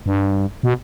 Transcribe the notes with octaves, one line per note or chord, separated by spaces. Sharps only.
G2
B2